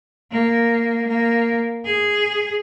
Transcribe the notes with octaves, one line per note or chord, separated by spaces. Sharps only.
A#3
A#3
G#4